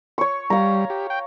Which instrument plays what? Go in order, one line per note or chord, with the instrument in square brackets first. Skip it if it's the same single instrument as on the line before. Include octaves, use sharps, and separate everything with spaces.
[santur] C#5 C#6
[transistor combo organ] G3 [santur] F5 A#5
[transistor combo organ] G4
G5